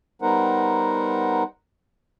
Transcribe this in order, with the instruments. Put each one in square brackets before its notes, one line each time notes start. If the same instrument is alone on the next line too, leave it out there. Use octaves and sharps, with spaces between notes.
[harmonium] G3 B3 D#4 A#4 C5 F#5